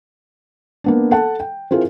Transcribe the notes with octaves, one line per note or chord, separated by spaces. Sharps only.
A#3 B3 D4
A4 F#5 A5
G5
C4 E4 F4 G#4 A#4